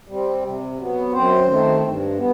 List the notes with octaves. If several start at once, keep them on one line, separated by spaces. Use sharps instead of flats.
G3 C4
C3
F#3 B3
F#2 C4 C5
D#3 A3 C4
G2
B3